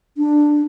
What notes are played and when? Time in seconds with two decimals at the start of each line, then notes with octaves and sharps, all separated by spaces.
0.17 D4